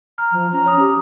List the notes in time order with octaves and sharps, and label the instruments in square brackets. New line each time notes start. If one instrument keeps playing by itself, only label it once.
[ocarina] A#5 [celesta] F6
[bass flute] F3
[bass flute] C#4 [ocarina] A#5
[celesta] C#5 D#6
[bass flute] G4